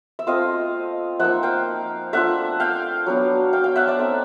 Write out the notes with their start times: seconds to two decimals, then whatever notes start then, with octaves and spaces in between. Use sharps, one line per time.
0.19 E5
0.27 A3 C4 F4 D#5 F5
1.20 F3 A#3 D#4 E5 F#5
1.43 F5 G5
2.13 A3 D4 F4 E5 F#5
2.60 F5 G5
3.06 F#3 B3 D4
3.53 F5 G5
3.64 F5 G5
3.76 E5 F#5
3.87 D5 E5
3.99 A3 C4 D#4